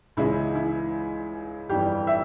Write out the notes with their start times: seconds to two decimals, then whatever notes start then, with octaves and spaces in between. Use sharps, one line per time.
0.17 C#2 C#3 E3 G#3 E4
0.55 E4
1.69 G1 F2 E3 G3 G4
2.07 E5